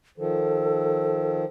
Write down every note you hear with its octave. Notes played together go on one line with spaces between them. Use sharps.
D#3 F3 A4